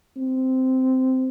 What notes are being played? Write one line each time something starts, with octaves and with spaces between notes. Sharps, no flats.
C4